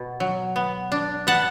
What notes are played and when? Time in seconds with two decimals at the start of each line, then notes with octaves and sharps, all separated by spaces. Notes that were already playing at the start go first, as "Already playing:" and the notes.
Already playing: B2
0.20 F#3
0.56 B3
0.92 D4
1.27 B3 F#5 A5